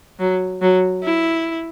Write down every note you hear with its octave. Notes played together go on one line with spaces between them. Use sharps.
F#3
F#3
E4